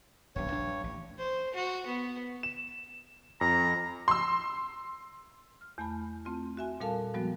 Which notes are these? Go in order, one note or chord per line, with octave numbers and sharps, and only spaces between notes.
D#1 B1 G2 C#5
A#1 D4
A1
C5
F#4
B3
E7
F2 A#5
C6 E6
F6
E2 A3 G#5 B5
A3 C4 F4
F#4 E5 G#5
A#2 G3 A4 A#4 F5 A5
F3 G3 G#3 B3 F#4